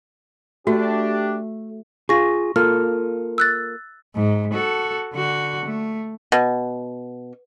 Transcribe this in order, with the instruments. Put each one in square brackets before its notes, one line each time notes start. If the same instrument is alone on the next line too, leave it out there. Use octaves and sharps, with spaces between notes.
[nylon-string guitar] A3 [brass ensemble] D4 G4 [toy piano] F#4
[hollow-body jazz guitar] F4 G#4 [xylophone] C#6 A#6
[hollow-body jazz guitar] A#3 F4 A4 [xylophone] F6
[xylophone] E6 F#6 A6
[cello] G#2
F#4 A4
D3 F#4
A3
[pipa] B2